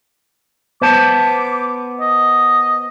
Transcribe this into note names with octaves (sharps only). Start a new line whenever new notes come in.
B3 C5 A5 D6
D#5